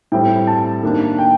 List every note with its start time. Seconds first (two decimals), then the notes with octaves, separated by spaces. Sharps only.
0.12 A2 G3 C4 G5
0.47 A5
0.82 D#3 A#3 D4
1.18 G5